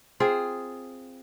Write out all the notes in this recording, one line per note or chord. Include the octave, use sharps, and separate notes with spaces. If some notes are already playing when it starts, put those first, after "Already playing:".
C4 F4 G#4